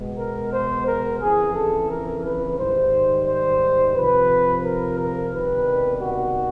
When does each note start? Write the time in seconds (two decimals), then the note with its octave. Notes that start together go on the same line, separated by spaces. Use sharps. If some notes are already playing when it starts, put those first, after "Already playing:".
Already playing: B2 G#3 B3
0.18 A#4
0.53 C5
0.87 A#4
1.21 F2 C#3 E3 G#4
1.55 A4
1.90 A#4
2.24 B4
2.58 G#2 D#3 G3 C5
3.26 C5
3.96 F2 C3 F3 B4
4.64 A#4
4.98 A#4
5.33 C#2 C3 D#3 G3 B3 B4
6.01 F#4